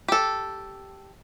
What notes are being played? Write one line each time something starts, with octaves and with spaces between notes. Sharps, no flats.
G4 A4